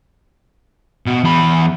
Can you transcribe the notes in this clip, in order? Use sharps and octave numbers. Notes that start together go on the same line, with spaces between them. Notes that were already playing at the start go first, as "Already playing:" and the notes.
B2
E2 B5